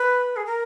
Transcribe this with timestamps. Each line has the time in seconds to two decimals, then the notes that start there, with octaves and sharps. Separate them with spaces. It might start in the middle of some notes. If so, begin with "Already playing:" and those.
Already playing: B4
0.36 G#4
0.46 A#4